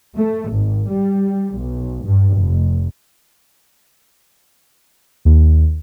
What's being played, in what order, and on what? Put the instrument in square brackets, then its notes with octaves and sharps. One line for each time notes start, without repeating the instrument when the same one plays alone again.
[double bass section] A3
G#1
G3
B1
G2
F1
[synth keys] D#2